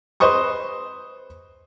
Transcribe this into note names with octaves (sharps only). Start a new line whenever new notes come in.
B4 C5 D#5 C#6 D#6